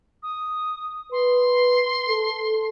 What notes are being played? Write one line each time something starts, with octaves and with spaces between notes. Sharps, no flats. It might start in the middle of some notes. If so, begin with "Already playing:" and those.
D#6
B4 C6
A4